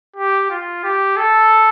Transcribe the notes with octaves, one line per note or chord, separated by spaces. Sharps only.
G4
F4
G4
A4